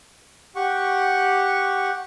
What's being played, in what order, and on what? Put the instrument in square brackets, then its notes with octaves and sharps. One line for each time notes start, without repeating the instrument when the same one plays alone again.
[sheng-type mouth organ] G4 F#5 C#6